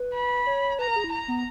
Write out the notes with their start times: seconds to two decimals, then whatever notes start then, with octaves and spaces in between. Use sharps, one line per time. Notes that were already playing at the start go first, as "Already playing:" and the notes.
Already playing: B4
0.14 B5
0.47 C#5
0.79 B4 A#5
0.88 A#4
0.96 G#4
1.04 E4
1.12 A#5
1.28 B3